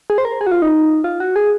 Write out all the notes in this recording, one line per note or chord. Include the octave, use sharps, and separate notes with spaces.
G#4
C5
A#4
G#4
F#4
F4
D#4
F4
F#4
G#4